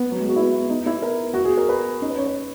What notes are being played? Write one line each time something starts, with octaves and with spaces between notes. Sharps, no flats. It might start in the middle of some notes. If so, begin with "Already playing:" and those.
Already playing: B3
F#3
G#3
F#4
B3 E4
B3 D#4
E4
A#4
F#4
G#4
A#4
B4
C#4 D#4
B4
C#5
B4